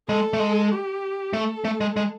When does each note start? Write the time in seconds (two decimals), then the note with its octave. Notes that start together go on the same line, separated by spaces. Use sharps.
0.09 G#3 A4
0.33 A3
0.40 G#3
0.71 G4
1.33 A3 A4
1.65 A3
1.81 G#3
1.97 G#3